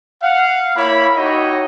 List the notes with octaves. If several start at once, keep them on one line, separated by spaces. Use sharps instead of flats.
F5 F#5
A#3 E4 C#5 B5
D#4 F#4 G4 C#5 D#5 E5